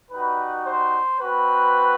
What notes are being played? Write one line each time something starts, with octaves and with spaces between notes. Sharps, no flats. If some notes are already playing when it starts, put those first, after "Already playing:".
G3 D#4 F#4 B4
C5
C4 F#4 B4